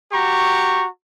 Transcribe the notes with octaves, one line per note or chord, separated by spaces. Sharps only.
F#4 G4 A#5 C#6